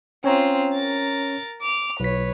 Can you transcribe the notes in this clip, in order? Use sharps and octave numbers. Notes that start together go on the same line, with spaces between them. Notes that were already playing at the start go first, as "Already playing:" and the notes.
C4 C#4 F4 C#5 A#5
A#4 A6
D6 F7
B1 B4 C#5 B6